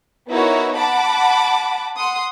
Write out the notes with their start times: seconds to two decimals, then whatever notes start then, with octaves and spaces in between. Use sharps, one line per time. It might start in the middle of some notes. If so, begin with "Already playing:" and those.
0.29 B3 D#4 E4 F#4 A#4 C#5
0.77 F#5 A5 B5 D6
1.97 F#5 C6 D#6